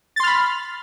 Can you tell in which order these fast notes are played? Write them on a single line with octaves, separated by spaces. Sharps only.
A6 C6 F6 B5